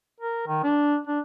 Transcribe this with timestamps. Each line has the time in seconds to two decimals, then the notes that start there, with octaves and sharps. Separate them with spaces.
0.20 A#4
0.47 D#3
0.63 D4
1.07 D4